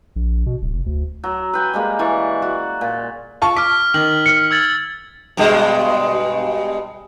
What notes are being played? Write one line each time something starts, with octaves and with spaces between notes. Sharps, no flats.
A#1
B2
D1
F1
D2
F#3
B4 G5 G#5
G3 G#3 A#3
E3 D5 C#6
F#4 D5
A#2
F4 A5 C#6
D6 F6 B6
D#3 F#7
F6 C#7
E6 G#6 A6
G2 B2 G#3